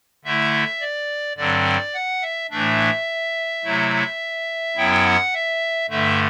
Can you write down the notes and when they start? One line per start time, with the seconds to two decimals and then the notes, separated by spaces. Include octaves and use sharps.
0.25 D3 A3 E4 E5
0.80 D5
1.37 G2 D3 F#3 C4 D5
1.94 F#5
2.22 E5
2.51 A2 E3 A3 D4 E5
3.64 C3 F#3 A3 E4
4.76 F#2 F#3 B3 E4 G5
5.05 F#5
5.34 E5
5.90 G2 D3 A3 E5